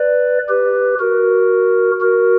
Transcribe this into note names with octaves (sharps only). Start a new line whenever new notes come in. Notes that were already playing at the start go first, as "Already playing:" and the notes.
Already playing: B4 D5
G4 B4
F#4 A#4
F#4 A#4